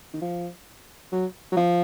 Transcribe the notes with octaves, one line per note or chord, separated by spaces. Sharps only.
D#3
F3
F#3
F#3
F3